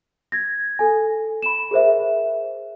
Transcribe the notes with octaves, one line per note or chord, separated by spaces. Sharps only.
G#6 A#6
A4 G#5
B5 E7
G#4 A#4 C5 E5